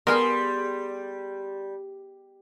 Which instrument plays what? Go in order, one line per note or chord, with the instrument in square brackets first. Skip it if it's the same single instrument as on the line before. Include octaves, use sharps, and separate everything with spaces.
[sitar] G3 [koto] B3 G#4 [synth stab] A#4 [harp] C6